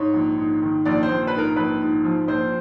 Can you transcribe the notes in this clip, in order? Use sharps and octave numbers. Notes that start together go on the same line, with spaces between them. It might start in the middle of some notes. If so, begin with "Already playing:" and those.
Already playing: G#2 C#5
A#1
G#2
D#3
A#1 D5
C5
A#1
B4
G#2 A#4
A#1 B4
G#2
F3
A#1 C5